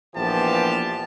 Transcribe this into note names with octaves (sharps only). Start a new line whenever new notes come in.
A#1 E3 F3 B3 G4 A5